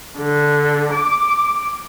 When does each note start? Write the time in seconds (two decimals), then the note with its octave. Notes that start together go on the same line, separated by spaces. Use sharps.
0.18 D3
0.94 D6